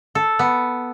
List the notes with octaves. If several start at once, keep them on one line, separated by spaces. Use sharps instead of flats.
A4
B3